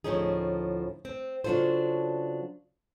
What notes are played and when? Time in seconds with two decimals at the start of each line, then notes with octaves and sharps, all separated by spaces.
0.04 D2 A2 F3 C#4 D#4 G#4
1.05 C4
1.44 C#3 F#3 D4 F4 A4 C5